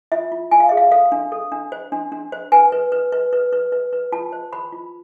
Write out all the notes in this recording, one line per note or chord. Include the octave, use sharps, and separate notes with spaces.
F4 E5
F4
F4 G#5
F5
G#4 E5
F5
A4 F5
D4
A4
D4
C5
D4
D4
C5
B4 G#5
B4
B4
B4
B4
B4
B4
B4
F4 A5
C5
C5 B5
F4